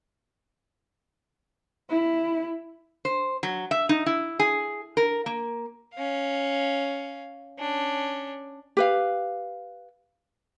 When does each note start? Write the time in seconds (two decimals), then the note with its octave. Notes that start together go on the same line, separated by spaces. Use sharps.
1.90 E4
3.05 C5
3.43 F#3
3.71 E5
3.89 D#4
4.06 E4
4.39 G#4
4.97 A#4
5.26 A#3
5.94 C#4 F5
7.59 C#4 D4
8.77 G4 B4 F5